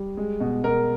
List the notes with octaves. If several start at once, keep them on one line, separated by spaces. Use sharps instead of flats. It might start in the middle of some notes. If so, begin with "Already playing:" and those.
Already playing: G3
G#3
B2
B2 A#4